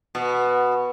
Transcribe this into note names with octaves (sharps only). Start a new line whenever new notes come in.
B2